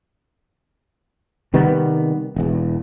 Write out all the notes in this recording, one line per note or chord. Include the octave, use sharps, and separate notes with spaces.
C3 D#3 G3 B3
E1 E2